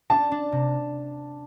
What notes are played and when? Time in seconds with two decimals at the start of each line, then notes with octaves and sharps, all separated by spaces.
0.10 D4 A5
0.31 D4
0.52 C3